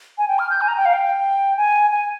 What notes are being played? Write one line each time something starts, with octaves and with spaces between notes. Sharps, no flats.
G#5
G5
F6
G6
G#5
A#5
G5
F5
G5
G#5
G#5